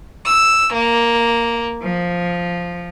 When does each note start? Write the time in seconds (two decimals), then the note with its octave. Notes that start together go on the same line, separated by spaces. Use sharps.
0.25 E6
0.72 A#3
1.81 F3